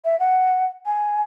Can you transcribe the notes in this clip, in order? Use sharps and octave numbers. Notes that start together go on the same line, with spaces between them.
E5
F#5
G#5